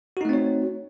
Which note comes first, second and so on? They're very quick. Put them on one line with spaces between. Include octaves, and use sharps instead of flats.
F#4 D#4 A3 C4 C#5